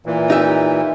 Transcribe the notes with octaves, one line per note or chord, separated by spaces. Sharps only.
A#2 E3
D#4 G4 E5